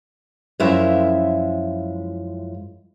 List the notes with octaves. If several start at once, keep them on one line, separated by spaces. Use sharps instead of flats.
F#2 F3 G#3 E4 F4 E5